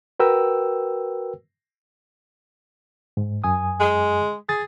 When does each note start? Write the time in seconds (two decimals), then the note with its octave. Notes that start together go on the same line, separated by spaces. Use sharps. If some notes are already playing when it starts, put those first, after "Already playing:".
0.20 F#4 A#4 B4 G5 E6
3.17 G#2
3.44 F#2 G#5 D#6
3.80 G#3
4.49 G#4 A6